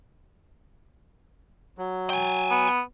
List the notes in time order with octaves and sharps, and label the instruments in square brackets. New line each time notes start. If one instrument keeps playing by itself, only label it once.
[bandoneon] F#3
[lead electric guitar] G5 G#5
[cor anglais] B3